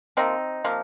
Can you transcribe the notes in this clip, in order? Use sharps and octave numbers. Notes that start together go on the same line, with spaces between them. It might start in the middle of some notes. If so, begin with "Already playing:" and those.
C3 F3 A#3 C4 D#4
C3 F3 A#3